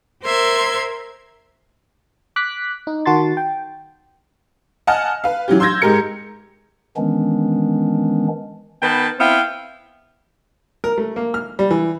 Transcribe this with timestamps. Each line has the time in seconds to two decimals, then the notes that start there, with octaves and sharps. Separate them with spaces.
0.23 A#4 C5 E5 C6 G#6
2.36 D6 F#6 B6
2.87 D#4
3.06 D#3 F#4 A5 C6 A6
3.37 G5
4.87 D#5 F#5 G#5 A5 F6
5.24 B4 F5
5.48 E3 F#3 C#4 G4
5.60 C6 E6 G6 G#6 A#6
5.82 G#2 G#3 G4 A#4 C#7
6.97 D#3 E3 G#3 B3 C#4 D4
8.82 D#3 B3 B4 G5 A5
9.18 B3 C4 E4 F5 G5
10.84 A#4
10.98 A3
11.16 A#3
11.34 F6
11.59 G3
11.71 E3